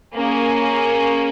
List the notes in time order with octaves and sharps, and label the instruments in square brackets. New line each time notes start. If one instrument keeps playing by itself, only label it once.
[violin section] A#3 C#4 G#4